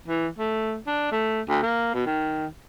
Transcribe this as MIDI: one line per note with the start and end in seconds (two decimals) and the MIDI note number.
0.08 0.28 52
0.38 0.77 57
0.87 1.07 62
1.12 1.41 57
1.49 1.60 38
1.62 1.94 58
1.94 2.04 47
2.06 2.46 51